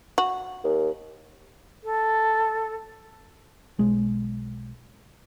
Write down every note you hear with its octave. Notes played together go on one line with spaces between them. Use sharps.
F#4
D#2
A4
B1 G#3